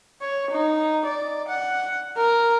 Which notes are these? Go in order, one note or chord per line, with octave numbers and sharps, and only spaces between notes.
C#5
D#4
D5
F#5
A#4